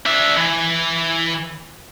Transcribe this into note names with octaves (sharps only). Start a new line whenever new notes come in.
D4 E5
E3